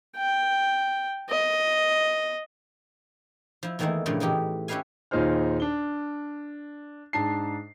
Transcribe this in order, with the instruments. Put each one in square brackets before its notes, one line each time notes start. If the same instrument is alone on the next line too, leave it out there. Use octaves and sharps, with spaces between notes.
[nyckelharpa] G5
D#5
[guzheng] F3 E4
E2 D#3 E3 A3 A#3 E4
G2 A#2 C#3 E3 F3 A3
A2 E3 D#4 G4
C#4 E4 G4 B4 F5 G#5
[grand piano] D#2 A#2 D#4 G#4 C5 F6
D4 G7
G#2 D4 A5 C7